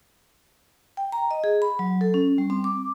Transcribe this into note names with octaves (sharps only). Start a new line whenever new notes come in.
G5
A#5
D#5
G#4
B5
F#3
A4
C#4
G3
C4
D6